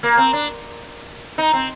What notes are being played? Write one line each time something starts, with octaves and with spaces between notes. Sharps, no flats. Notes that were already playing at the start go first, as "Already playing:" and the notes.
A#3
C4
D4
D#4
C4